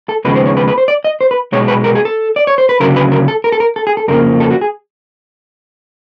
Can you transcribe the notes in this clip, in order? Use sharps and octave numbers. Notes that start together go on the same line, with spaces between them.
A4
D#2 C#3 F3 G#3 B3 B4
C5
C#5
B4
B4
C5
D5
D#5
C5
B4
B1 B2 G#3 B3 C#5
B4
A#4
G#4
A4
D5
C#5
C5
B4
D2 C#3 F#3 A#4
B4
A#4
A4
A#4
A4
A#4
A4
G#4
A4
F2 C#3 F3 A#3 A#4
A4
F#4
G#4